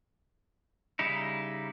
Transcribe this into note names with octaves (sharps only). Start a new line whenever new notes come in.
C#3 G3 D#4 E4